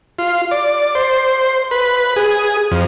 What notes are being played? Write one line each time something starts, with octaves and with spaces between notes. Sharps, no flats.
F4
D5
C5
B4
G#4
F2